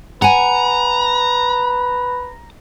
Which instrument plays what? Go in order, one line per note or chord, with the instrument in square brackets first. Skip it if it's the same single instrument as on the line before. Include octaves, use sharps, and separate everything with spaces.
[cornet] B4 [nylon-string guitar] F#5 G#5 [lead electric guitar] A#5